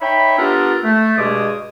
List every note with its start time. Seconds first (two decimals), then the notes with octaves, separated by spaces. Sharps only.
0.01 D#4 C#5 E5 G5 B5
0.38 B3 D4 F4 G4 A4 A#4
0.84 A3
1.17 G2 B2 G#3 G#4 D6 D#6